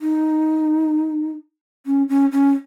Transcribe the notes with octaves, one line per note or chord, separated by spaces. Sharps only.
D#4
C#4
C#4
C#4